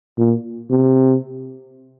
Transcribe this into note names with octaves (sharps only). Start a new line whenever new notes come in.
A#2
C3